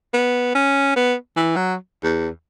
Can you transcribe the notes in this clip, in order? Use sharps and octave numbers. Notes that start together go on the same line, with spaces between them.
B3
C#4
B3
E3
F#3
E2